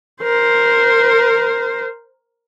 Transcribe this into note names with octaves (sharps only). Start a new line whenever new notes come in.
A#4 C5